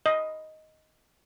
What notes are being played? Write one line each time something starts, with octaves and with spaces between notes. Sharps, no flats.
D#5